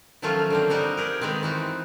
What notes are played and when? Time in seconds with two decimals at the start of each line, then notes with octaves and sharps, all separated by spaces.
0.22 D#3 F3 F#3 A3 C#4 F4
0.50 D3 A#3 C4
0.70 G3 D#4 F#4 A#4
0.97 G4 G#4 A#4
1.21 D#3 G#3 B3 C4
1.43 E3 D#4 F#4